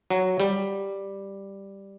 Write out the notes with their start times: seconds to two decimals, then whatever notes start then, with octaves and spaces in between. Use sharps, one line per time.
0.10 F#3
0.40 G3